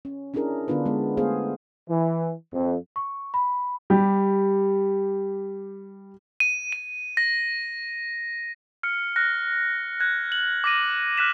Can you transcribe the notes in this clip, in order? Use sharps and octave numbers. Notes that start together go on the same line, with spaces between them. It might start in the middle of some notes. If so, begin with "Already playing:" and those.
C#4
C#4 D4 E4 G#4 A#4
D3 B3 D4 F4 B4
G#3 B3
A3 B3 G#4 C5 F5
E3
F2
C#6
B5
G3 G4
D#7
D#7
A#6
F6 C#7
F6 F#6 A#6
F#6 G#6
F#7
D6 A#6 D#7
F6 F#6 A#6 B6 E7